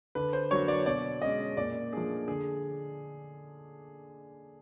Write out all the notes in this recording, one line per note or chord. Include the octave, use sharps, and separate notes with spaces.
D3 B4
C5
F#3 A#3 D4 C#5
D5
B2 D5
G#3 C#4 D#5
A#2 D5
F3 A3 D4 G#4
D3 G#4